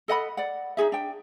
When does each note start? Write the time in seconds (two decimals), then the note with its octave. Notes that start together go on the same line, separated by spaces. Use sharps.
0.08 A4 D#5 F#5 B5
0.37 D5 F#5
0.77 D#4 F#4 G#4 E5
0.92 D4 G5